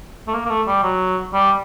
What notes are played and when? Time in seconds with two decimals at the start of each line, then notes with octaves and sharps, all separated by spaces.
0.27 A3
0.34 A#3
0.45 A#3
0.50 A3
0.67 G3
0.83 F#3
1.33 G3